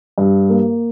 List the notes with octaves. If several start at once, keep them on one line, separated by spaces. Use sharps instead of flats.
G2
A#3